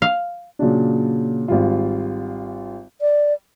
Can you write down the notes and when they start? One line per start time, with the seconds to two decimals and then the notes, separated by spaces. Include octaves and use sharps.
0.02 F5
0.59 A#2 C#3 F#3 D4
1.48 G#1 G3 F4
3.01 D5